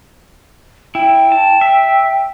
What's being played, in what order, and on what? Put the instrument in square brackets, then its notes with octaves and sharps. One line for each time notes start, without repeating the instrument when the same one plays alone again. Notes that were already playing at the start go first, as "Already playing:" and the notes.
[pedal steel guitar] E4 [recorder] G5
[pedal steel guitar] A5
E5